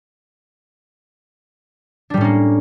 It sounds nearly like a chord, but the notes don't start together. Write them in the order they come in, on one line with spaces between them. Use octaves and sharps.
D4 G3 A2 C#4 A#3